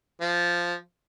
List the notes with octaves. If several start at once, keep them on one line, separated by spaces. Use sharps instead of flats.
F3